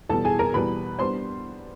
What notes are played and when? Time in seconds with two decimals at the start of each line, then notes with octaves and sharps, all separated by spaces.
0.09 E2 B2 G3 A4 A5
0.25 G#4 G#5
0.39 A#4 A#5
0.54 E2 B2 G3 B4 B5
0.99 G3 B3 D4 C5 C6